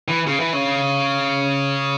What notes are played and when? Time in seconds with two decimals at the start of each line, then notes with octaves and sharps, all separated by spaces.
0.08 E3
0.27 C#3
0.40 E3
0.53 C#3